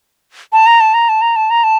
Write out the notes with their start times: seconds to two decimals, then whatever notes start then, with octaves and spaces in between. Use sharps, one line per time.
0.53 A5
0.67 A#5
0.80 A5
0.94 A#5
1.09 A5
1.22 A#5
1.36 A5
1.50 A#5
1.64 A5